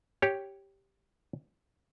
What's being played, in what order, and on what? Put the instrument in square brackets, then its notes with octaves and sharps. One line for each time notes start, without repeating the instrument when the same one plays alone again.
[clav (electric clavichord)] G4 C#5